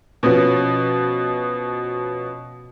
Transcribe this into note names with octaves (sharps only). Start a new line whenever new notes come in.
B2 F3 B3 C#4